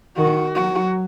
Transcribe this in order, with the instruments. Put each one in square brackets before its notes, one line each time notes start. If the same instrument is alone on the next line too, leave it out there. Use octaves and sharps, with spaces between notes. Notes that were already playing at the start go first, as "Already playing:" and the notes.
[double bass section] D#3 [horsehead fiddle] F#4
[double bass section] F#3 [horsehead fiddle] F#4